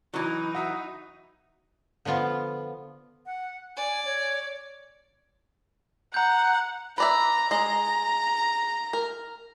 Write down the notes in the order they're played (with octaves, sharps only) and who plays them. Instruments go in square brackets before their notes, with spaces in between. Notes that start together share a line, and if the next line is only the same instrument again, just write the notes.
[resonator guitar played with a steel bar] E3 F#3 [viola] D#4 [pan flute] E4
[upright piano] F#4 E5 [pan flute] D#6
[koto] D3 F3 B3 F4
[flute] F#5
[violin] D5 [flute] G#5
[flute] C#5
[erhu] F#5 [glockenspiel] A#5 G6
[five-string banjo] B4 D5 E5 [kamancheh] A#5
[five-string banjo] G#3 D#5 [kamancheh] A#5
[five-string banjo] A#4